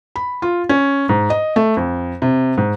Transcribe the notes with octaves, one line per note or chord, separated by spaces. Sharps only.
B5
F4
C#4
G#2
D#5
A3
F2
C3
G#2